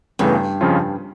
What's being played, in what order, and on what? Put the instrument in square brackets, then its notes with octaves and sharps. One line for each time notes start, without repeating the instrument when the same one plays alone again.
[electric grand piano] E2 C#3 E3 A3 [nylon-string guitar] G2
[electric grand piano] F2 C#3 F3 C#4 F4